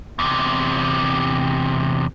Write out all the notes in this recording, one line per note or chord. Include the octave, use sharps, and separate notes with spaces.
E2 C3